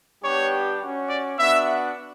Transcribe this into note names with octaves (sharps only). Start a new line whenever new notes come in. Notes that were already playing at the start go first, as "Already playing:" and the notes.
G3 B3 D4 G4 C#5
C#4 F#4
D5
B3 D4 F#4 E5